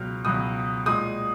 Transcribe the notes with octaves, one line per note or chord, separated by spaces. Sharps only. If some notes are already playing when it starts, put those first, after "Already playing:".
Already playing: C#2 B2 F#3 F6
C#2 B2 F#3 D#6
A#2 G#3 D#6